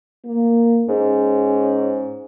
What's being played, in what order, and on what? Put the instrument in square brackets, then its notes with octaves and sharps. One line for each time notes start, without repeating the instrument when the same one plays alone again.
[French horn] A#3
[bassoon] G#2 [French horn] C#4